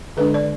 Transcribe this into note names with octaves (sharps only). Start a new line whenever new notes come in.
D3 G#3 D4 B4
D5